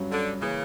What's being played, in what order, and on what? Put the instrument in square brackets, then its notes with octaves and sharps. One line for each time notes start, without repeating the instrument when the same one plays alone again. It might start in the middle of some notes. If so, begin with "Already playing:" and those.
Already playing: [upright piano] G2 F#3 C#4
[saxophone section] D3
[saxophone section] C#3 [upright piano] E3 A#3